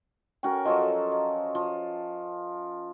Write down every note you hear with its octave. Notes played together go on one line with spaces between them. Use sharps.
C#4 F#4 A#4 G5
F3 F#3 A4 D#5
D#5
F3